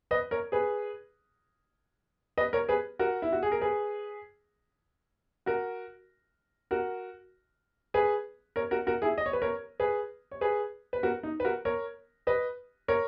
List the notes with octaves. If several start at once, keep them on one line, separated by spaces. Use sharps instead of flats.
B4 D#5
A#4 C#5
G#4 B4
B4 D#5
A#4 C#5
G#4 B4
F#4 A#4
E4
F#4
G#4
A#4
G#4 B4
F#4 A#4
F#4 A#4
G#4 B4
A#4 C#5
F#4 A#4
F#4 A#4
E4 G#4
D#5
C#5
B4
A#4 C#5
G#4 B4
C#5
G#4 B4
B4
F#4 A#4
D#4
B4
F#4 A#4
A#4 C#5
B4 D#5
A#4 C#5